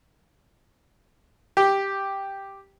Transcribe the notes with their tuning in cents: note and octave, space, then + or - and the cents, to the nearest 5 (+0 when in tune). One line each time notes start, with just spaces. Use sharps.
G4 +0